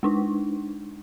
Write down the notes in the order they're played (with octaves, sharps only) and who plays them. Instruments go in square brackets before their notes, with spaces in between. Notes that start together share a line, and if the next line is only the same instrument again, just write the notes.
[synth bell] G#3 D4 D#4